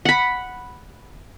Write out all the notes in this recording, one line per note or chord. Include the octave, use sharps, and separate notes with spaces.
F#5 B5